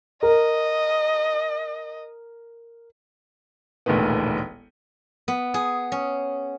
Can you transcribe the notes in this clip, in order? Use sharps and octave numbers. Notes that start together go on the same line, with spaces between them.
A#4 D#5
E1 A1 D2 A#2 D#3 B3
B3
G#4
C#4